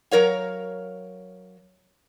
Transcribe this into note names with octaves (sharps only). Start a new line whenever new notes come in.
F#3 A#4 C#5 F5